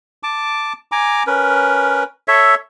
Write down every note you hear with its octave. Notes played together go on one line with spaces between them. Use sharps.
A5 D6
G#5 A#5 D6
C#4 A#4 B4
A4 C#5 E5